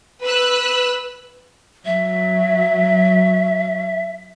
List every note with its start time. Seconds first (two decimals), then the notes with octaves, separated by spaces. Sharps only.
0.23 B4 E6 F#6
1.85 F#3 E5